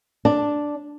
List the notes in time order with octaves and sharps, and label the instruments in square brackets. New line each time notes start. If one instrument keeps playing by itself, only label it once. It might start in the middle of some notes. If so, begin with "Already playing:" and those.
[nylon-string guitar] D4